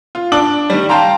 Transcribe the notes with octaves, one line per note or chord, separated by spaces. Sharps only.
F4
D4 D6 F#7
D#3 G3
F5 G5 A5 A#5 C6